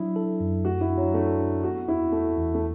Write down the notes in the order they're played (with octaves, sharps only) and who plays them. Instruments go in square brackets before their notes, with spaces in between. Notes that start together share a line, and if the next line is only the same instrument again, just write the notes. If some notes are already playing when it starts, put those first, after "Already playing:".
Already playing: [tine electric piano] F#3 D4 [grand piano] E4
[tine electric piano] A4
F#2
[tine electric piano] A3 [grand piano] F#4
[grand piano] E4
[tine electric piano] D4
[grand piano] F#3
[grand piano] A3 [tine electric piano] D4
[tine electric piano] D4
[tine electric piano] B3 [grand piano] F#4
[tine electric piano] E2 [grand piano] E4
[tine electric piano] E2 [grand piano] A3
[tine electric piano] E2
[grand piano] A3